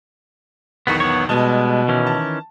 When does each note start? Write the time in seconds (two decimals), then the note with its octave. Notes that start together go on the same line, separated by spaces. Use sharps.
0.87 B1 E2 D#3 B3 F#4
1.00 B3 C#5
1.29 B2 G3 G#3 B3 A5
1.88 D#3 E3 C#4
2.07 A5